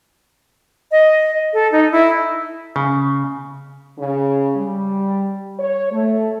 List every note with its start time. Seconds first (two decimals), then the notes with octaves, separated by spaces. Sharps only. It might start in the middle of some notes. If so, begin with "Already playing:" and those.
0.92 D#5
1.53 A4
1.72 D#4
1.92 E4
2.76 C#3
3.98 C#3
4.55 G3
5.58 C#5
5.91 A3